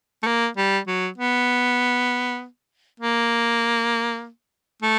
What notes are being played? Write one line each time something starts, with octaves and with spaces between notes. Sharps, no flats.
A3
A#3
G3
F#3
B3
A#3
A3